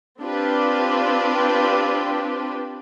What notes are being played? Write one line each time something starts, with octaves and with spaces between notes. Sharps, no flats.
C4 D4 F4 G4 B4